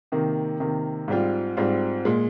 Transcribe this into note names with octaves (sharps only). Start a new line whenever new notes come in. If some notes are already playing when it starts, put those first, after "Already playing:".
C3 D#3 A#3
C3 D#3 A#3
G#2 G3 C4 F4
G#2 G3 C4 F4
A#2 G#3